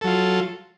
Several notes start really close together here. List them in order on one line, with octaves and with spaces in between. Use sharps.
A4 F#3 F4